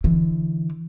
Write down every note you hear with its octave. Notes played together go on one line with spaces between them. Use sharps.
D3 E3